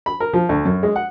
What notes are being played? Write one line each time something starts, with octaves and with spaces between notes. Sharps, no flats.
B5
A#4
F3
D2
F#2
G#3
F#5